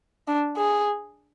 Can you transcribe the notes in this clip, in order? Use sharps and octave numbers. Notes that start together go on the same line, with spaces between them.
D4
G#4